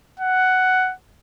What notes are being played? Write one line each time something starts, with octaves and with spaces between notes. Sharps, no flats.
F#5